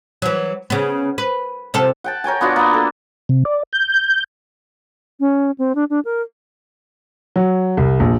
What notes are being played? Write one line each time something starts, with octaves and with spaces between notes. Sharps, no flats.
E3 F#3
C#3 B3
B4
C3 F4 A4
F#5 G5 A5
A#4 C#5 G5 G#5
B3 D4 F4 F#4
A#3 B3
A4
C3
D5
G6
C#4
C4
D4
D4
A#4
F#3
C2
A#1